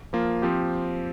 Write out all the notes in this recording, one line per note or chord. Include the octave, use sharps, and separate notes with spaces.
F3 A#3 F4
F3 C4 G4